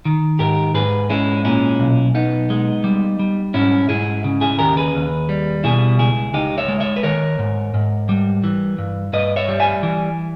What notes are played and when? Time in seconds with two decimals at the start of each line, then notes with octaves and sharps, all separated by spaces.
0.05 D#3
0.39 G#2 G4 A#4
0.74 G#2 G#4 B4
1.10 G#3 C#4 E4
1.45 A#2 C#4 E4
1.80 B1
2.14 B1 B3 D#4
2.50 G#3
2.84 G3
3.19 G3
3.54 G#2 C#4 E4
3.89 G#2 E4 G#4
4.24 C#3
4.41 E4 G#4
4.59 D#2 G4 A#4
4.77 G#4 B4
4.94 D#2
5.29 G3
5.64 B2 E4 G#4
5.99 C#2 E4 G#4
6.34 C#2 D#4 G4
6.58 C#5 E5
6.68 G#3
6.80 C#5 E5
6.96 B4
7.03 D#3 A#4 C#5
7.39 G#2
7.74 G#2
8.09 G3
8.44 E3
8.78 G2
9.13 G2 B4 D#5
9.36 C#5 E5
9.49 G3
9.60 E5 G#5
9.83 E3